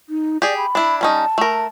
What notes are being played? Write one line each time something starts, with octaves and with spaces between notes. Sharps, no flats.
D#4
G4 G#4 D5
B5
D4 E4
G3 C#4 D#4 A5
A3 A#4